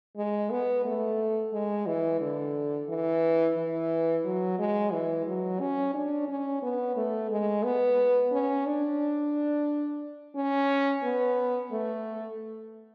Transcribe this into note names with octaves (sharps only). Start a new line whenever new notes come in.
G#3
B3
A3
G#3
E3
D3
E3
E3
F#3
G#3
E3
F#3
C#4
D4
C#4
B3
A3
G#3
B3
C#4
D4
C#4
B3
A3